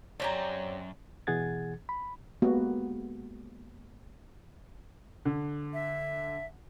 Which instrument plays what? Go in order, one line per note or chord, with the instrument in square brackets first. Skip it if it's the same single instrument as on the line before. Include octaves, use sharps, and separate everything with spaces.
[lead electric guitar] C#2 F#2 [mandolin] C4 G4 A#5 [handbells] C#5 D5
[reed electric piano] B2 E3 G#4 F#5 G#6 A6
B5
[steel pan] G#3 A#3 B3 F#4 G4
[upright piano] D3
[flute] E5